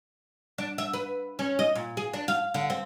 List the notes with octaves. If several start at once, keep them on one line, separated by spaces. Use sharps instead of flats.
D4
E5
B4
C#4
D#5
A#2
G#4
D4
F5
D3
C4